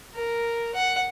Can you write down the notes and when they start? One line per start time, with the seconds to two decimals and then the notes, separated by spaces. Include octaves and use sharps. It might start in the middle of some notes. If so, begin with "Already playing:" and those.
0.14 A#4
0.75 F#5